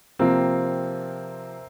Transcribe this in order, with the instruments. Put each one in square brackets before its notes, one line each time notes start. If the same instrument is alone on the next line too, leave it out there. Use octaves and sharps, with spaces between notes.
[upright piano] C3 F3 A#3 C4